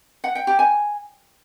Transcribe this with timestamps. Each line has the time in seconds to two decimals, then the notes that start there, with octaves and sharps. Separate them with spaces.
0.24 F#5
0.35 G5
0.47 G4
0.59 G#5